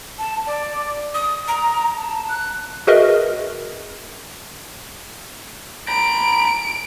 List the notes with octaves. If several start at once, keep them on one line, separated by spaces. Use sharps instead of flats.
A5
D5
D#6
A#5
A5
F#6
F#4 G#4 A#4 B4 D#5 E5
A#5 B5 D7